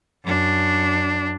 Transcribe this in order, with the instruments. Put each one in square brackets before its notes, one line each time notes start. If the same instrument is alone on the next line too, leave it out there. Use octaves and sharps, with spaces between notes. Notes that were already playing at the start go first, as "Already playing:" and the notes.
[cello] F#2 D4